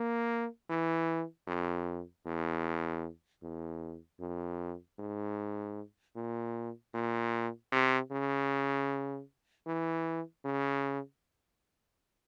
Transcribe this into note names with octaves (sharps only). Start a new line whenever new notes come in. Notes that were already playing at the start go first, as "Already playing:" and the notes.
Already playing: A#3
E3
F2
E2
E2
F2
G#2
A#2
A#2
C3
C#3
E3
C#3